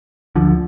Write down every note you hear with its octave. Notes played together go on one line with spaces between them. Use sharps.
D2 D3 F3